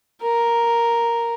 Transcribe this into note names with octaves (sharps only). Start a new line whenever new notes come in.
A#4